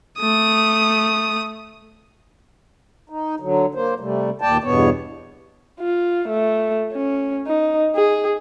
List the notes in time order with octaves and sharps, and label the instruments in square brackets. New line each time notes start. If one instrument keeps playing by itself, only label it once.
[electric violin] A3 D#6
[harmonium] D#4
D3 F#3
A#3 C5
C3 G3 A3
D#2 A#2 D5 G5 A5
E2 G2 B2 B3 C#5
[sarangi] F4
A3
C#4
D#4
G#4